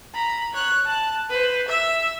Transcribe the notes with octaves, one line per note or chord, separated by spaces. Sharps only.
A#5 B5
C#5 F#6
A5 F#6
B4 C5
E5 E6